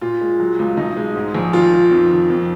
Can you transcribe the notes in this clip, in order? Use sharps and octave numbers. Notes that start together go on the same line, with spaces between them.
A#2 F4
G#3
F#3
C#2
B1 D#4
G#3
G#2
A#1
D#3 F4
D#3
F2
D#3
F2